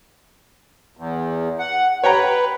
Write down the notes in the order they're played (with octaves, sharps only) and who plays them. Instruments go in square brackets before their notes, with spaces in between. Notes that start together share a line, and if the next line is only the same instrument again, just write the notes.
[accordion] E2
F#5
[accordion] B4 [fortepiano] C#5 G5 A#5